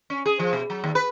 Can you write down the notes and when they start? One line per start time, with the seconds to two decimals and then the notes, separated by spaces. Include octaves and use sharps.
0.10 C#4
0.26 G#4
0.39 F3
0.53 B2
0.70 F#3
0.84 D#2
0.95 B4